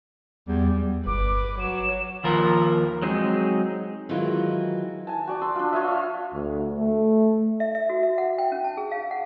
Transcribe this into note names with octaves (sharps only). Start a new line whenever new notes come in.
E2 G3
G1 B4 D6
F#3 E7
D#2 F3 A#4
F#3 G#3 C4 D#4 G#4
D#3 E3 F#3 G#3 E4 F4
G#5 A5
F#4 D5 A5
A5 C6 E6
D4 F4
F4 C#5 D#5 E5
F5
D2
A3
E5
E5
F#4
E5
F#5
G5
C#4
A5
G#4
F5
F#5